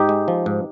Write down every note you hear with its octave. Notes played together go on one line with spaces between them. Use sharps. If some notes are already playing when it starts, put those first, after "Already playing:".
Already playing: G#2 D#4 G4
G#3
F3
G#2